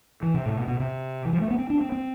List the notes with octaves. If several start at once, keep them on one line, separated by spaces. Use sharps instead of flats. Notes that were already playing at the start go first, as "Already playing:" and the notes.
E3
C3
A2
B2
B2
C3
E3
F3
A3
B3
C4
D4
C4
C4